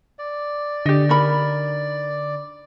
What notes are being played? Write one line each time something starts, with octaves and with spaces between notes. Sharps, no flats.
D5
D3 G4 D#5
D#4 A#4 B5